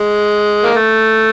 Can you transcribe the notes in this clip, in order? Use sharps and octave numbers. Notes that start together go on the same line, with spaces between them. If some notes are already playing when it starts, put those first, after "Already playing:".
Already playing: G#3
A#3
A3